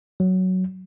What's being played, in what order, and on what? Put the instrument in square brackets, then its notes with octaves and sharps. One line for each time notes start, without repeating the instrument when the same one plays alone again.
[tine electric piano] F#3